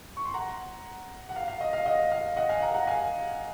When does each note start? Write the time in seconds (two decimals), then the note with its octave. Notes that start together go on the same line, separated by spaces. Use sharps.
0.17 C#6
0.25 C6
0.34 F#5 A#5
1.29 F#5
1.36 F5
1.48 F5
1.61 D#5
1.73 F5
1.86 D#5 F#5
2.11 F5
2.36 D#5 F#5
2.49 F5 G#5
2.62 F#5 A#5
2.74 F#5 A#5
2.87 F5 G#5